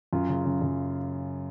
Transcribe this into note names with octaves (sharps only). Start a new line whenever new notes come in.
F#2 F4
C#3
C#3
F#2